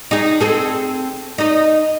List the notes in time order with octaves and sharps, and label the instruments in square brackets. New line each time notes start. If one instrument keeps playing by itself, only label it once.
[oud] D#4 G#4
C4 G#4 A4
D#4 D#5